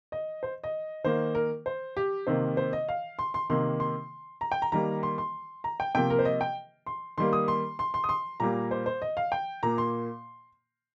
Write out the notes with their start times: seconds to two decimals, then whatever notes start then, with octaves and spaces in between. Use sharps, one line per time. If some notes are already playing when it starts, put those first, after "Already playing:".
0.12 D#5
0.43 C5
0.64 D#5
1.04 D#3 A#3 C5
1.35 A#4
1.66 C5
1.97 G4
2.27 C3 D#3 A#3 C5
2.57 C5
2.73 D#5
2.89 F5
3.19 C6
3.34 C6
3.50 C3 D#3 A#3 C6
3.80 C6
4.41 A#5
4.52 G5
4.62 A#5
4.72 D#3 G3 A#3 A#5
5.03 C6
5.18 C6
5.64 A#5
5.80 G5
5.95 C3 F3 A#3 G5
6.10 A#4
6.19 C5
6.25 D#5
6.41 G5
6.87 C6
7.18 D#3 G3 A#3 C6
7.33 D#6
7.48 C6
7.79 C6
7.94 C6
8.04 D#6
8.09 C6
8.40 A#2 G3 A#3 A#5
8.71 C5
8.86 C5
9.02 D#5
9.17 F5
9.32 G5
9.63 A#2 A#3 A#5
9.78 C6